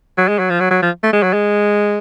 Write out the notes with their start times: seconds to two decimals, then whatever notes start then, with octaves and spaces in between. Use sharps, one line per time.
0.18 F#3
0.28 G#3
0.39 F#3
0.50 F3
0.60 F#3
0.71 F#3
0.82 F3
1.03 A3
1.13 G#3
1.23 F#3
1.33 G#3